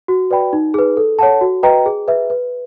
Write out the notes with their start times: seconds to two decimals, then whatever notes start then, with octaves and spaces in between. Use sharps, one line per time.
0.08 F#4
0.31 B4 D5 G5 B5
0.53 D#4
0.74 G#4 B4
0.97 A4
1.19 C#5 F#5 A5
1.41 F#4
1.63 B4 D#5 G5 A#5
1.86 G#4
2.08 B4 E5
2.30 B4